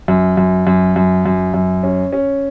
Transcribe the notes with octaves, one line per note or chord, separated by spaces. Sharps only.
F#2
F#2
F#2
F#2
F#2
F#2
C#4
C#4